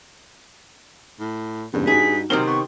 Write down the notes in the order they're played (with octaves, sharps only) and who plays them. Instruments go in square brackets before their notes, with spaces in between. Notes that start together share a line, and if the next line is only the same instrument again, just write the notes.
[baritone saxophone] A2
[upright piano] F#1 E2 C#3 [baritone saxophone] G2
[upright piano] D#4 F#4 [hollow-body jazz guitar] G#4 [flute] B6
[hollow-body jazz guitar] C3 D#3 C4 [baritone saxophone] F#3 [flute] F6 [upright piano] G7
[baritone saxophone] B3 [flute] C#6